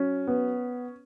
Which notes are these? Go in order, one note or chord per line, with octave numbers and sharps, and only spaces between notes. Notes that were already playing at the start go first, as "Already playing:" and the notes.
Already playing: F#3 C#4
B3